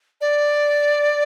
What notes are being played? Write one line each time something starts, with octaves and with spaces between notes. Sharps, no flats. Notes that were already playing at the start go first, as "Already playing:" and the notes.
D5